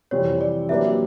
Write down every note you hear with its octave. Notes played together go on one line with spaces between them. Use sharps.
F2 C3 E3 G3 C4 C#5
D5
F#3 A#3 D4 G4 B4 E5